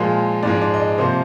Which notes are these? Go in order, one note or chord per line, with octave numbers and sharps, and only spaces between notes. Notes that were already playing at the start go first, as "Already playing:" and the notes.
Already playing: A#2 F3 G#3
G#2 F3 G#3 D5
D5
D#5
D5
C3 F3 A#3 C5